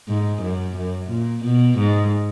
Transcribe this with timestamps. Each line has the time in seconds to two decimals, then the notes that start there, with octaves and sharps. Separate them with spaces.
0.09 G#2
0.42 F#2
0.77 F#2
1.10 A#2
1.44 B2
1.78 G#2